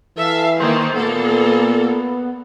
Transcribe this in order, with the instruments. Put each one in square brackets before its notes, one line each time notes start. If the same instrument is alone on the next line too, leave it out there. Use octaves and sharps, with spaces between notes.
[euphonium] E3 [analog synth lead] A4 [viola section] E5 F5
[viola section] D#3 A#3 [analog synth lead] C5
[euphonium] A#2 [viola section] A#3 A4 [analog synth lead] B3